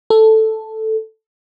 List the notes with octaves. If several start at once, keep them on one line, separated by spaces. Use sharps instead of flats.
A4